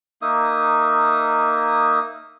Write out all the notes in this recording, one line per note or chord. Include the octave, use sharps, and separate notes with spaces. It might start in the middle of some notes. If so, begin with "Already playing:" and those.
A#3 D#4 E5 D#6